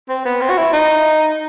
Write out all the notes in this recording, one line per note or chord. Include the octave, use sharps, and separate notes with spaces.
C4
B3
C4
F#4
E4
D#4